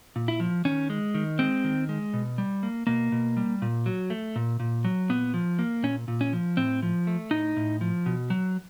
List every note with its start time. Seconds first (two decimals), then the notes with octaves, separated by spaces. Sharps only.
0.16 A#2
0.28 E4
0.40 F3
0.65 D#3 C#4
0.90 G#3
1.14 D#3
1.39 G#3 C4
1.64 D#3
1.89 G#3
2.14 B2
2.38 G3
2.63 A#3
2.87 B2 A#3
3.12 B2
3.37 G3
3.62 A#2
3.86 F#3
4.10 A3
4.36 A#2
4.60 A#2
4.85 F#3
5.09 A#2 B3
5.34 F3
5.59 A#3
5.83 A#2 C#4
6.08 A#2
6.21 C#4
6.33 F3
6.57 A2 C4
6.82 F3
7.07 A3
7.31 A2 D#4
7.57 A2
7.81 F3
8.06 B2
8.30 F#3